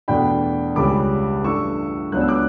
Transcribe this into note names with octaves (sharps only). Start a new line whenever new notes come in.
E2 B2 A3 D4 G5 B5
C#2 C#3 G3 C#4 B5 D6
G2 E3 A3 C#6 E6
C#2 C#3 F#3 B3 D4 F#6
E6
D6 F#6